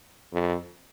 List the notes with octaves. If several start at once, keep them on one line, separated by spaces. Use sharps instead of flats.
F2